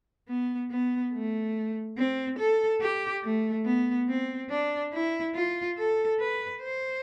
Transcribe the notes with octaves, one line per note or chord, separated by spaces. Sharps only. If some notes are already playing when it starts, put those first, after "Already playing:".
B3
B3
A3
C4
A4
G4
A3
B3
C4
D4
E4
F4
A4
B4
C5